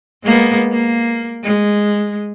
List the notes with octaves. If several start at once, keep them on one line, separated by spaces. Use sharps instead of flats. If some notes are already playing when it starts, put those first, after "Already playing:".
G#3 A#3 B3
A#3
G#3